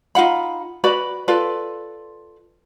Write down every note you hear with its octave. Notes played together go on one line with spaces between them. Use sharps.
D#4 F4 F#5 B5
F#4 B4 D5 B5
F4 A4 B4 D5